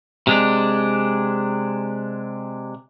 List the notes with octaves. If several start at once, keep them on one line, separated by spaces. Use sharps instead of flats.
C3 G#3 D4